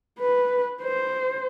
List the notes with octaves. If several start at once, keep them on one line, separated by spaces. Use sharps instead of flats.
B4
C5